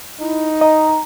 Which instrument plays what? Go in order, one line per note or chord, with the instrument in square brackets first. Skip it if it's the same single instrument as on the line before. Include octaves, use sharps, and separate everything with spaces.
[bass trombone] D#4 [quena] E4
[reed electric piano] D#5 [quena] A#5